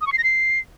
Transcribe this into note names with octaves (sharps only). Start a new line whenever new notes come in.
D#6
C#6
C7
A#6
C7